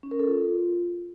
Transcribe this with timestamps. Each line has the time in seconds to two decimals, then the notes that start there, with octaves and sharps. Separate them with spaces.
0.03 C#4
0.11 A#4
0.19 A4
0.28 F4